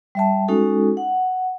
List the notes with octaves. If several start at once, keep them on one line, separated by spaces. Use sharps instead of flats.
G3 E5 A5
G#3 C#4 D#4 F#4 A4
F#5